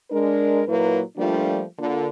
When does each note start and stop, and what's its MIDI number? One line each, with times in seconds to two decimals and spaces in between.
0.11 0.62 56
0.11 0.62 62
0.11 0.62 70
0.67 1.01 46
0.67 1.01 54
0.67 1.01 58
0.67 1.01 64
0.67 1.01 71
1.17 1.63 53
1.17 1.63 55
1.17 1.63 57
1.17 1.63 58
1.17 1.63 62
1.17 1.63 65
1.78 2.08 50
1.78 2.08 58
1.78 2.08 65